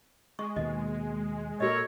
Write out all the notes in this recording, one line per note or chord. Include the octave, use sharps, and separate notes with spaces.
G#3 C#6
D#2 B2 A#3 D#5
A#2 F#4 A4 A#4 C#5 D#5